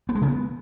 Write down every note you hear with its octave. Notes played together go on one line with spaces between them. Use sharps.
B3
G#3
C#3
B3